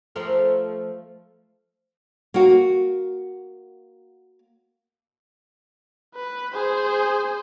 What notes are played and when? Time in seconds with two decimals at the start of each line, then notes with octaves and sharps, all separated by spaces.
0.16 F3 A3 A#4
2.34 A#3 F#4
6.15 B4
6.54 G#4 C5